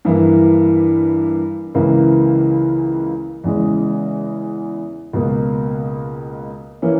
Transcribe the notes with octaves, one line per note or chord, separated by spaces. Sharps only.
G2 E3 A#3
C#2 C#3 E3 A#3
E2 C#3 G#3
C#2 B2 A#3
E3 A#3 C#4